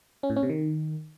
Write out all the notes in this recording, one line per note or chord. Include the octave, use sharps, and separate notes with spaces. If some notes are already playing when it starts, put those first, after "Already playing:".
C#4
A2
C#4
C3
D#3